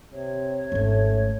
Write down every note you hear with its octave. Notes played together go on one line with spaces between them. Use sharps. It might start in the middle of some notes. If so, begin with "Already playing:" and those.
C3 C#5
G#1 A3 C#4